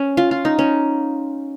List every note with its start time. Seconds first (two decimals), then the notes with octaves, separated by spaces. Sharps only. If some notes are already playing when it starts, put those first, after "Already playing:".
Already playing: C#4
0.17 F4
0.31 F4
0.45 D#4
0.59 C#4